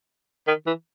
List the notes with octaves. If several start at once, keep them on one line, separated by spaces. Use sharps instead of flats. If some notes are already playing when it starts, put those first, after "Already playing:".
D#3
E3